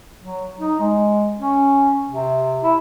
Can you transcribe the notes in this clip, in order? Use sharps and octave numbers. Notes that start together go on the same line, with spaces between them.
F#3
D#4
G#3
C#4
C3
E4